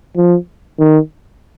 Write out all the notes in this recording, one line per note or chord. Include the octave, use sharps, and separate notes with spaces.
F3
D#3